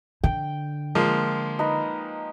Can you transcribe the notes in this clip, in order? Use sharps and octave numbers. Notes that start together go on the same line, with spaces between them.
D3 G5
F3 G#3 A#3
D#4 B4 A#5